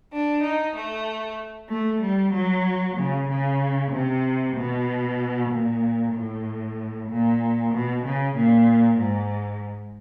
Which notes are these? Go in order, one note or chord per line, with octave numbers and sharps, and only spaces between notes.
D4
D#4
A3
A3
G3
F#3
C#3
C#3
C3
B2
A#2
A2
A#2
B2
C#3
A#2
G#2